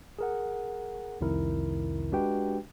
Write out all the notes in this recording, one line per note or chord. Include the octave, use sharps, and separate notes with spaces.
G#4 A#4 F#5
C2 F2 C3 D#3 E4 A#4
G#3 D4 F#4 G4 B4 G5